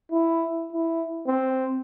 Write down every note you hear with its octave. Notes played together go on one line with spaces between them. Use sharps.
E4
E4
C4